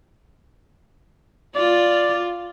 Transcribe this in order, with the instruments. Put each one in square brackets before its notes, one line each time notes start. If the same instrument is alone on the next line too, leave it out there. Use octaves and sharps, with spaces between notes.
[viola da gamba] F4 [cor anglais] D5